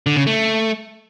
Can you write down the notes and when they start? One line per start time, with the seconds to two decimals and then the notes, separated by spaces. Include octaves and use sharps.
0.06 D3
0.17 C#3
0.27 A3